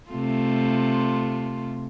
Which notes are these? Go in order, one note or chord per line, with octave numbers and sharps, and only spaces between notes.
C3 A3 F4